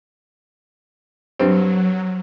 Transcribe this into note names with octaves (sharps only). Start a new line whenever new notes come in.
G2 F#3 C4